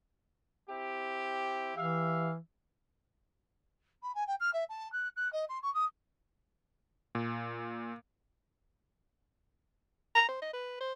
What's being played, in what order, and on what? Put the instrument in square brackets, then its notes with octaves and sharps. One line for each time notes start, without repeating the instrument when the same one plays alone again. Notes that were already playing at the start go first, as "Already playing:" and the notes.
[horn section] C4 E4 G4
[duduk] E3 [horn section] G4 E5 F5
[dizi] B5
G#5
G5
F6
E5
A5
F#6
F#6
D#5
C6
C#6
D#6
[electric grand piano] A#2
[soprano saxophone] A#5
C5
D#5
B4
C5